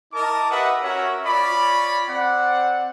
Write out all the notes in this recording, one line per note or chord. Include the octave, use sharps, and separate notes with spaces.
E4 A#4 D#5 A5 D6
G4 B4 D#5 E5 F#5
C#4 F#4 A#4 C#5 E5 F#5
F4 C#5 D5 B5
C4 D5 F#5